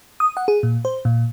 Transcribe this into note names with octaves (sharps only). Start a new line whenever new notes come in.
D#6
F#5
G#4
A#2
C5
A#2